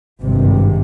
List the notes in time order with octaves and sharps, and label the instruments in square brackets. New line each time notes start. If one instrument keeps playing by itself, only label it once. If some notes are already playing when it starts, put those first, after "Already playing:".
[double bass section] G#1 G2 C3